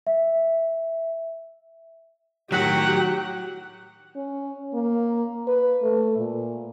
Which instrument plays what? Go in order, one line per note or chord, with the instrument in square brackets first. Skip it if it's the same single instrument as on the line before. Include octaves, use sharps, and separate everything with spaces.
[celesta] E5
[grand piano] A2 D#3 B6 [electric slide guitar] F#3 F#4 [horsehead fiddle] G4 [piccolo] F#5
[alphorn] C#4
A#3
B4
A3
A#2